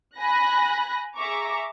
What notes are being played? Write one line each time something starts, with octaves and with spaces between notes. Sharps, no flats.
G#5 B5 F#6 A#6
G#4 E5 A#5 C#6 D6